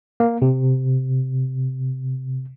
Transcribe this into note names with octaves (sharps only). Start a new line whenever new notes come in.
A#3
C3